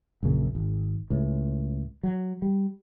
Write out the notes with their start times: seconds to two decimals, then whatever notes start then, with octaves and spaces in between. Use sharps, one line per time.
0.23 A#1 F#2 C#3 A#3
0.55 G#1
1.10 C#2 A2
2.03 F#3
2.42 G3